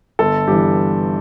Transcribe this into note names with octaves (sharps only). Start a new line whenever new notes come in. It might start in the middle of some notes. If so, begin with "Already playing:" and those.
G1 A4
G2 E3 G4